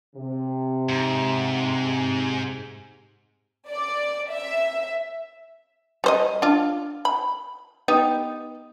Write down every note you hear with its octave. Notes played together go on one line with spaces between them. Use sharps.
C3
G#2
D5
E5
G3 C5 D#5
D4 F4
B5
B3 D#4 G4